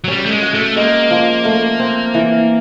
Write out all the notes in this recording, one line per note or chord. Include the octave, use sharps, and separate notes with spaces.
F#3
G3 C#4
A3
G#3
F#4
A3
G#3 A#3
F3
A3
C4
E3